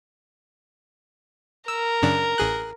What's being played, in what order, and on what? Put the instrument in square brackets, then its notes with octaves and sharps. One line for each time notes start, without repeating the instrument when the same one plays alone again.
[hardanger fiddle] A#4 [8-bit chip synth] E6
[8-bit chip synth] F#2 C#3 D4
A1 G#4 F#6